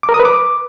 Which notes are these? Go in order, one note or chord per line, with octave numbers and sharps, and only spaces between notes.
D6
A#4
D#6
B4
D6